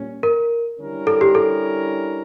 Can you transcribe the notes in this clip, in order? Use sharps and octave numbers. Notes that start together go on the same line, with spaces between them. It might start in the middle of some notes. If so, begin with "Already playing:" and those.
Already playing: A#2 G3 C#4
A#4
D3 G3 C#4 E4 A#4
A4
G4
A4